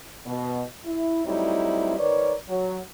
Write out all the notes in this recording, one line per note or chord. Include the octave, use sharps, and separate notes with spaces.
B2
E4
F#3 G3 A3 C4 D#4 E4
D#3 A#4 B4 C#5 D5
F#3